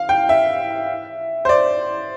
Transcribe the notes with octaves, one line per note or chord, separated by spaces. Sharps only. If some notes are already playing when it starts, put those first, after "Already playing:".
Already playing: F5
G5
E5
C5
D5